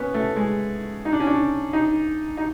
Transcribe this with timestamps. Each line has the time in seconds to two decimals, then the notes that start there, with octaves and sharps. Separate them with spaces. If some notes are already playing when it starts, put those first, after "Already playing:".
Already playing: B3 C#4
0.14 A3
0.36 G#3
1.05 D#4
1.12 D4
1.20 C#4
1.27 D4
1.73 D#4
2.37 D#4